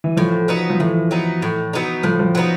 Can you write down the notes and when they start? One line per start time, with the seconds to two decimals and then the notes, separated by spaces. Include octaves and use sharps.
0.04 E3
0.17 A2 F3
0.48 F#3 B3 D#4
0.70 F3
0.80 A2 E3
1.11 F#3 B3 D#4
1.42 A2
1.73 F#3 B3 D#4
2.03 A2 F3
2.19 F3
2.35 F#3 B3 D#4